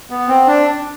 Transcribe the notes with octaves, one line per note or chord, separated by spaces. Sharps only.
B3
C4
D4